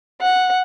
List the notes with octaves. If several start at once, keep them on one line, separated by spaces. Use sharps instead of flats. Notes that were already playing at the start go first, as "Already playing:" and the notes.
F#5